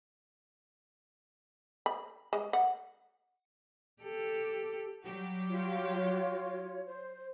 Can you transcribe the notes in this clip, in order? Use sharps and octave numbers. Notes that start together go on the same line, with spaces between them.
B5
G#3
F#5
G4 A4
F#3 G3 G4
F4 F#4 C#5
C5